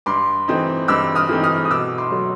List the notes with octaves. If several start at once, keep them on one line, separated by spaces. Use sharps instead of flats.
G2 C6 D6
E3 A3 C4 D#4
G2 D6 E6
D#6 F6
E3 A3 C4 D#4
D#6 F6
D#6
B2 D6 E6
C6 D6
F#3 A3